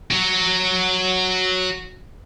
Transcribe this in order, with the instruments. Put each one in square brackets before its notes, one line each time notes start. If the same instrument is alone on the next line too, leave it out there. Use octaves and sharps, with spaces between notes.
[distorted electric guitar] F#4 C#5